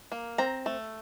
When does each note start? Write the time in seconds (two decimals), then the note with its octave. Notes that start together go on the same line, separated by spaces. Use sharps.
0.12 A#3
0.38 C4 A#5
0.66 A3